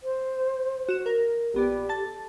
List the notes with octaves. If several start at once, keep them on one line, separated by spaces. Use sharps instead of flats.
C5
F#4 E7
A#4
A#1 B3 G4 D5
A4 A5 A6